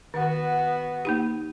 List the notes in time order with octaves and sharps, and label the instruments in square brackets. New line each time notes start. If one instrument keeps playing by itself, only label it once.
[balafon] D#3 [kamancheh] B3 F#4
[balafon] A#3 D#4 G4